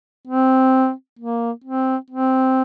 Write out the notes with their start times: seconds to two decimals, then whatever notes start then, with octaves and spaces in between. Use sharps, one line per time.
0.27 C4
1.19 A#3
1.64 C4
2.10 C4